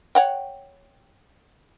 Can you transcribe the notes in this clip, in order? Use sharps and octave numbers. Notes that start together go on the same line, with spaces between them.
C#5 F#5 G5